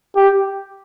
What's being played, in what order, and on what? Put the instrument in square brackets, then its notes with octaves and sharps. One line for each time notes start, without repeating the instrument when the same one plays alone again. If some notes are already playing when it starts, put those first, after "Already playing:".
[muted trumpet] G4